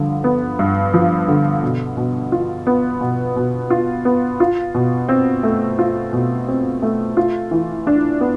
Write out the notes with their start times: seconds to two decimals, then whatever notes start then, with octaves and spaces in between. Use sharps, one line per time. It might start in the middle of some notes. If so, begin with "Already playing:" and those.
Already playing: G2 D3 F3
0.24 B3
0.59 G2
0.94 F3
1.28 D3
1.63 B2
1.97 B2
2.32 F4
2.67 B3
3.01 B2
3.36 B2
3.70 F4
4.05 B3
4.40 F4
4.75 B2
5.09 C4
5.43 A3
5.79 F4
6.13 B2
6.48 C4
6.82 A3
7.17 F4
7.51 E3
7.87 D4
8.21 B3